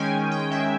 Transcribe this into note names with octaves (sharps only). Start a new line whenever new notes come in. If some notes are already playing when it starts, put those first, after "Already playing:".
Already playing: D#3 G#3 C#4 G5 G#5
D#3
D#3 G5
G#3 E5